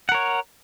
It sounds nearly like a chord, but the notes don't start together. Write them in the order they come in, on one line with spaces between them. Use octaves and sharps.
F#5 A#4 C#5